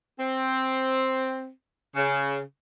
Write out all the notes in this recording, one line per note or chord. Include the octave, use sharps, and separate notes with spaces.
C4
C#3